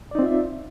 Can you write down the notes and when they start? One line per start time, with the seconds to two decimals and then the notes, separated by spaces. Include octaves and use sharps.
0.11 D5
0.15 D#4
0.19 C4
0.22 F4
0.26 E5